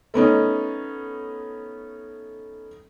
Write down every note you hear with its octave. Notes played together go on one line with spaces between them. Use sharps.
A3 B3 C#4 D#4